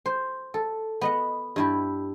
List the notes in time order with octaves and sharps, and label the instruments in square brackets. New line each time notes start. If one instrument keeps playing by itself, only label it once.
[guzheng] C5
A4
B3 D#5 F#5
G2 E4 G4